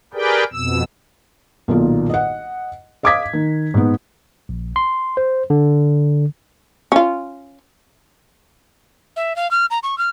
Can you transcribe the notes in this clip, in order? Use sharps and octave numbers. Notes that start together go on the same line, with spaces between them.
G4 G#4 A#4 B4 D5 G5
F2 B2 E6
B1 A#2 D#3 D#4 F4
D#5 F#5
D#5 F5 D6 D#6 G#6 B6
D#3
G#2 B3
A#1
C6
C5
D3
C#4 F4
E5
F5
F6
A#5
C#6
F6